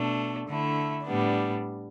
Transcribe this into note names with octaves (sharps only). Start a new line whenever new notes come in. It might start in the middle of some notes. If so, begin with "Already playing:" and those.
Already playing: B2 A3 D4
D3 A3 E4
A2 G3 B3 D4